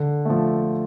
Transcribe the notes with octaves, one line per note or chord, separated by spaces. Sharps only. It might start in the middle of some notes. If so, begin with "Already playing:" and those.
Already playing: D3
F3 A3